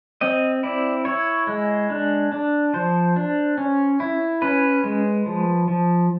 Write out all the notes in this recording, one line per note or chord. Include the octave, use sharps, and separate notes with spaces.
C4 D#5
E4 D5
E4 C#5
G#3
D4
D4
F3 C5
D4
C#4
E4
C#4 B4
G#3
F3
F3